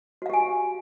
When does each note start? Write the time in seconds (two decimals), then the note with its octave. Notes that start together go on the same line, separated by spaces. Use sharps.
0.22 F#4
0.26 F5
0.30 G4
0.33 G#5